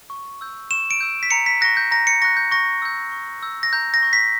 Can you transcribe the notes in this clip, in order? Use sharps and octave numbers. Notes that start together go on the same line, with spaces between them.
C#6
E6 G6
C#6 E7
D7
E6 G6
B6
A#5 C#7
B6
C#6 F#6 A#6
G6
A#5 A#6
C#7
C#6 F#6 A#6
G6
C#6 A#6
E6 G6
C#6
E6 G6
A#6
A#5 G6
A#6
C#6 G6
B6